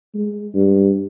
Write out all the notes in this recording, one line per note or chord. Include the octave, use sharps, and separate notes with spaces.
G#3
G2